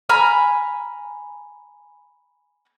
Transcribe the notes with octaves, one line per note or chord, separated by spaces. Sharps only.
G#5 A#5 B5 F6